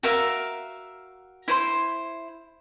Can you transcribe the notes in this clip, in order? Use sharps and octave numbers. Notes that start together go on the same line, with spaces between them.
F#4 A#4 E5 F5
E4 C5 C6